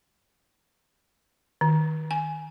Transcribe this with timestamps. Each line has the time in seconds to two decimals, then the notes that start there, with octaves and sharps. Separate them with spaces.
1.61 D#3
2.11 G#5